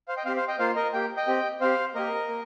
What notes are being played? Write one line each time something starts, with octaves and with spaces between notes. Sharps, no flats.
C5 F5
D#5 G5
C4 G4 C5 F5
C5 F5
D#5 G5
A#3 F4 C5 F5
A#4 D#5
A#3 G4 G5
D#5 G5
C4 G4
C4 G4 C5 F5
A#3 G4 A#4 D#5
A#3